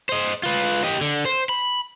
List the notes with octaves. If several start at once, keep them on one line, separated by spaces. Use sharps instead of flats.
C5 D#5
F4 B4
G4 D#5
D3
C5
B5